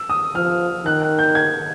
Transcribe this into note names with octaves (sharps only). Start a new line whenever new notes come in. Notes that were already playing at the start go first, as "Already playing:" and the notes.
Already playing: E6
D#6
F3 F6
D#3 F#6
F#6
G6
G#6